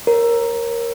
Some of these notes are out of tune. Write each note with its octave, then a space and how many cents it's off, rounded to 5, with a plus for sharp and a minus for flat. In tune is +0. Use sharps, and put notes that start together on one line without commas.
A#4 +5 C#5 -35